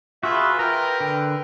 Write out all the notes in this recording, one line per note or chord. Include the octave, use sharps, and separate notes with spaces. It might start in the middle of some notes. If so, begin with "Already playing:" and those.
F4 F#4 G#4 B4 E5
A#4 B4 G5 A#5
D3 G5